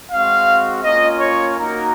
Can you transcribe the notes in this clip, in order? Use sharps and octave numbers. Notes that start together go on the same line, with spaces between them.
G#3 C4 F#4 F5
A#3 C#4 F4 D#5
C#5
A#3 D#4 F#4 A#4